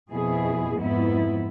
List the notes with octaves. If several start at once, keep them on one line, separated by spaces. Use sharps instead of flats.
F2 B2 E4 G#4
F2 G#2 B3 E4